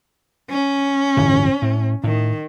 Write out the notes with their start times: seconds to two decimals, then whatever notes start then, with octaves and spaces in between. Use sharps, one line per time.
0.50 C#4
1.17 D1 G1 E3
1.62 A2
2.04 A2 D#3